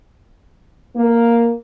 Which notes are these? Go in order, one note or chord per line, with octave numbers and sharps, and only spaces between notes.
A#3